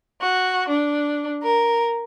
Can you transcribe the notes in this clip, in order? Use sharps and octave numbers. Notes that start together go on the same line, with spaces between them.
F#4
D4
A#4